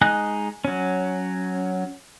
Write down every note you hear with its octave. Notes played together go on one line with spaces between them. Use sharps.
G#3 D#4 D#5 G#5 F#6
F#3 C#4